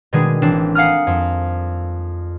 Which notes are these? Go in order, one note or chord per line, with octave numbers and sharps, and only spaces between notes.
B2 D#3 G3 G#3 D4 G#4
A1 G#3 C4 D4 E7
F5 F#5 G#5 A#5 D#6 F6
F2